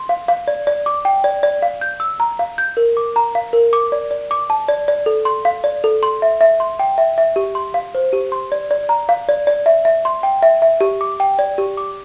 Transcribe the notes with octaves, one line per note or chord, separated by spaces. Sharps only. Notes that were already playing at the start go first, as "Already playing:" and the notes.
Already playing: C6
F5
F5
D5
D5
D6
G5
D5
D5
F5
G6
E6
A#5
F5
G6
A#4
D6
A#5
F5
A#4
D6
D5
D5
D6
A5
D5
D5
A4
C6
F5
D5
A4
C6
E5
E5
C6
G5
E5
E5
G4
C6
F5
C5
G4
C6
D5
D5
A#5
F5
D5
D5
E5
E5
C6
G5
E5
E5
G4
D6
G5
D5
G4
D6